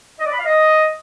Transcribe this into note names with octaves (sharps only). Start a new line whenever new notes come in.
D#5
D5
B5
F5
D#5